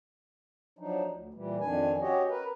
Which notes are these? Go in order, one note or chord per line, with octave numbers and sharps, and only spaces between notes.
F3 F#3 D4 D#4
D2
A#2 E3 G3
F2 D#3 D4 G#5
C#4 F#4 G4 C#5 D#5
A#4 B4